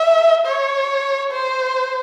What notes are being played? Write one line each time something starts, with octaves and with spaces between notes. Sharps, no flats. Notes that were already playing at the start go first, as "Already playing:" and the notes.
Already playing: E5
C#5
C5